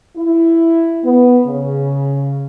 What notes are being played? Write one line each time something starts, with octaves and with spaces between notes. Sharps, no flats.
E4
B3
C#3